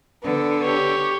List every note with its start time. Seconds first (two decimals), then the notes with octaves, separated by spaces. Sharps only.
0.23 D3 B3
0.63 G4 C#5